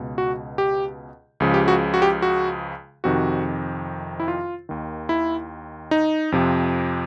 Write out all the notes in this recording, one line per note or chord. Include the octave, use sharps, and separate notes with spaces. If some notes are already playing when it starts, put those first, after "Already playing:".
Already playing: C#2 B2
F#4
G4
C#2 C#3 F3
G4
F#4
F#4
G4
F#4
F2 C3 D#3 F#4
E4
F4
D#2 D#3
E4
D#4
F2 C3 F3